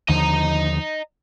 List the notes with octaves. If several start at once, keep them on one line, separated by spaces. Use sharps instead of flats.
D#2 D3 F3 D#5 A#5